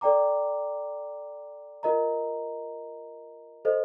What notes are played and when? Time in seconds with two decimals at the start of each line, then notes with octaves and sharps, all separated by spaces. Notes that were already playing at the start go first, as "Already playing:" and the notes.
0.01 A4 D5 G5 A#5 D6
1.83 F4 A#4 D#5 A#5
3.65 A4 C5 D#5